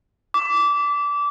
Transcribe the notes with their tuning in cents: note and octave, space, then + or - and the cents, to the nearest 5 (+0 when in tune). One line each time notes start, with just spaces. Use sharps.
D6 -20